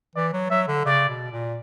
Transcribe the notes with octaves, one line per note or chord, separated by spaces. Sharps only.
E3 D5
F#3
F#3 E5
D3
C#3 D5
B2
A#2